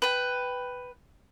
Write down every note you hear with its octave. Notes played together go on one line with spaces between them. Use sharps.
B4 G5